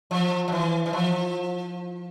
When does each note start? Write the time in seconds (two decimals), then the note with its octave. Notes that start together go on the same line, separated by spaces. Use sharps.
0.11 F3
0.48 F3
0.52 E3
0.86 E3
0.93 F3